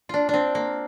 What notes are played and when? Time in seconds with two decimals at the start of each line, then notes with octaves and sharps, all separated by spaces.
0.09 D4 F4
0.29 C4 D4
0.55 A#3